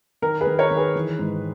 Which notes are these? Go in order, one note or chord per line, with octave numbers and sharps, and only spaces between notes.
D#3 A#4
G#4 B4
D#3
A#4 C#5
D#3
G#4 B4
E3
G#2